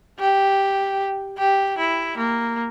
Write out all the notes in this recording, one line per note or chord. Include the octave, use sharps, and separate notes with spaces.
G4
G4
E4
A#3